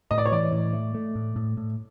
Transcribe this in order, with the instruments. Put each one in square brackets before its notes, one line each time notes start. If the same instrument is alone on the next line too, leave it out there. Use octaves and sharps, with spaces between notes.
[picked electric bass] A2 [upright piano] D#5
[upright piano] D5
C#5
[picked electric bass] E3 [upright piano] D5
[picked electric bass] A2
A3
A3
A2
A2
A2